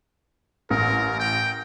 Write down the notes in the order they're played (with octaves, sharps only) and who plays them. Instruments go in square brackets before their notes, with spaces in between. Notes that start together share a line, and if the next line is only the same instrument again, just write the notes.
[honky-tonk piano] A1 [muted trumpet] A#4
[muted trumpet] G5